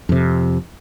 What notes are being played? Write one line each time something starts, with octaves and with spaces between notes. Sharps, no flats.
F2 C3